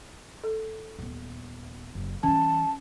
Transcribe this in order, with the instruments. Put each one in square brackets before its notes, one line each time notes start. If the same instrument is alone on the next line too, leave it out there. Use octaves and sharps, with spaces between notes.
[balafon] A4
[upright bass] D#1 B3
F#1
[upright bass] E3 G3 [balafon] C#4 [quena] A5